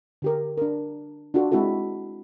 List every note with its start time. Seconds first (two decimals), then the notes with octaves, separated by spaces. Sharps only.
0.22 D3 G4 A#4
0.58 D4 A#4
1.34 D4 F4 F#4 A4
1.52 G#3 C4 E4 F#4 A4